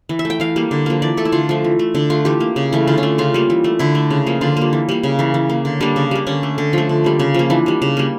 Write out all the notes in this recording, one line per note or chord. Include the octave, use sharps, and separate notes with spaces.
E3
E5
A3
G5
E3 F5
G3 A#3
D3
F3 A#3
E3 D5
A3 A4
E4
D3 F4
F3 A3
E3
A3
D3 D4
A3 F4
E3 G4
A#3
C#3
E3 A3
D3 F4
C#4
A3
C#3 F4
G3 A#3
E3
A3
D3 E4
A3
C#3
F3 A#3
D3 F4
G3 A#3
E3
G3 A#3
C#3
E3 A#3
E3
A#3
D3
G3 A#3 D4
C#3
G3 A#3
D3 C#4
A3
D3
F3 A3
D3
G3 A#3
C#3
F3 A#3
E3 D4
G3 A#3
C#3
G3 A#3